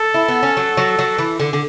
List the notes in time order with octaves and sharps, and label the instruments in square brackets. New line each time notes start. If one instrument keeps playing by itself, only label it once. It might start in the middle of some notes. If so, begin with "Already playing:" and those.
Already playing: [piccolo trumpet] A4
[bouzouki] E4
B3
C#4
F#3
F#3
F#3
E3
D3
D3